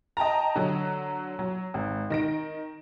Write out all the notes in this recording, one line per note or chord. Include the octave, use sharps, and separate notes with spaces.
D#5 G5 A5 A#5
D3 F#3
F#3
G#1
D#3 A#6 D7